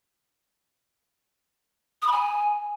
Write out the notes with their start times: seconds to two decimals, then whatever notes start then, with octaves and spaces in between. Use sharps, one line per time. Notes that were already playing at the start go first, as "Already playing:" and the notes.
2.02 D#6
2.07 B5
2.12 G#5